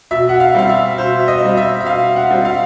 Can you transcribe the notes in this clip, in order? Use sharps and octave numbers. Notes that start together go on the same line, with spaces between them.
B2 E5
F#5
F5
G3 C4 F5
E5
B2 C5
E5
D#5
G3 C4
E5
E5
B2 F5
F#5
G3 C4
F5